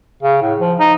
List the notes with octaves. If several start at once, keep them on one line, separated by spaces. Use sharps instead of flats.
C#3
A2
F3
D#4